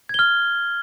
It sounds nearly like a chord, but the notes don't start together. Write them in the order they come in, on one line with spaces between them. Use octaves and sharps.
G#6 G7 F6